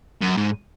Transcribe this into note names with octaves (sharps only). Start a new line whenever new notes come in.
F#2
G#2